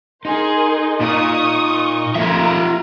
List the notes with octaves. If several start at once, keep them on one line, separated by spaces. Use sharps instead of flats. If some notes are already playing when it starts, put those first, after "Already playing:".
D#4 G#4 A#4 C6
A#2 C#6 D#6
F3 A3 A#3 F4 E5 A#5